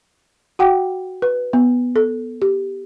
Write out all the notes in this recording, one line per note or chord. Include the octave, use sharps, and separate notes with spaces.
F#4 F#5 G5 D6
B4
B3
A4
G4